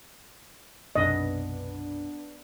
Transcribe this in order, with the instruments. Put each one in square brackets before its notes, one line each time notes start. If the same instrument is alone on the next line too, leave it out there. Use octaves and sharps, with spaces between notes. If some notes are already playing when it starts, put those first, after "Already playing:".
[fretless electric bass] B1 F#2 C3 [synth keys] B3 D4 [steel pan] D#5